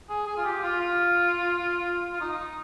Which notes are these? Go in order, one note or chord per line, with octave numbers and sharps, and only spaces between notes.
G#4
G#4
F4
G4
F4
F4
F4
D#4